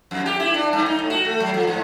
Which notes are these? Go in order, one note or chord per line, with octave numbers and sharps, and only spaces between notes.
F2
G4
E4
D4
G2
D#4
A2
F#4
A3
F#3
F3
G#2